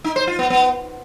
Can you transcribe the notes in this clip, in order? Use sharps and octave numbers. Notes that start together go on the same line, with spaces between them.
D#4
C5
F4
B3
B3